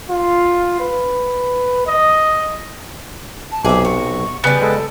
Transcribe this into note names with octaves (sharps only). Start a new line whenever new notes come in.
F4
B4
D#5
A5
B1 C3 G#4 E5 D6
F#4 C#6
C#3 G3 B3 G#5
G#3 A4